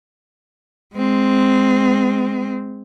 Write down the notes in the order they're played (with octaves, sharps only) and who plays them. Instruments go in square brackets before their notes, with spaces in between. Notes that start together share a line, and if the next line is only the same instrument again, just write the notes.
[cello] G#3 C4